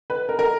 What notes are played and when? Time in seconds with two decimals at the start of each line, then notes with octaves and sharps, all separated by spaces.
0.10 B4
0.29 A#4
0.39 A#4